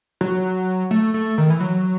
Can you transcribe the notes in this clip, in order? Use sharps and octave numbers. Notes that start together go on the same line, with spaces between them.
F#3
A3
A3
D#3
E3
F#3